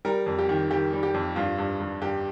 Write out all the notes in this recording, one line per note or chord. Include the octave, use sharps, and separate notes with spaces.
G3 A#4
F2
G4
D#3
D#3 G4
G3
G4
F2
G2 F4
G2
G2
G2 G4